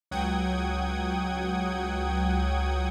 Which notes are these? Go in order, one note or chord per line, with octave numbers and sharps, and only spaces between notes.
C#2 F#3 F#5 G5 D#6 G#6